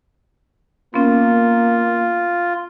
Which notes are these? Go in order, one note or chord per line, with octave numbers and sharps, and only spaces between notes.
A#3 B3 C#4 F4